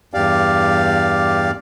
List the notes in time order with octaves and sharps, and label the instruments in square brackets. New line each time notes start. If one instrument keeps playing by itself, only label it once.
[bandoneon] E2 G2 G4 D5 F5